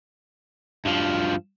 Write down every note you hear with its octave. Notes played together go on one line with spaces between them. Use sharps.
G2 F3